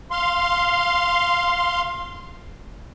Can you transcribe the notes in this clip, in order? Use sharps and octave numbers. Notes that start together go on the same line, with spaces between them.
F5 C6